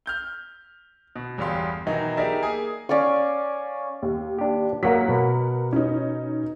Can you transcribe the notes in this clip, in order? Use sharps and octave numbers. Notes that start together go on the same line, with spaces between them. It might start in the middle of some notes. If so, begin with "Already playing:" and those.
F6 G6 G7
B2
G1 E2 G3 G4 F5 C6
B2 D#3 E3 F#3 D#4
D#4 G4 G#4 A#4 D5 E5
A#3 G#4 G#5
C#4 D5 F5 C#6
D#2
D4 G4
F#3 A#3 A#4 F#5 B6
B2
C#4 D#4